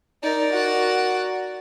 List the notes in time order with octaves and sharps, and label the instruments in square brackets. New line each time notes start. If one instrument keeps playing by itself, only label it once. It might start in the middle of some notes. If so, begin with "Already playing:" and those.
[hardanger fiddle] D#4 [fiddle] A#4 D5
[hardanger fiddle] F#4 F#5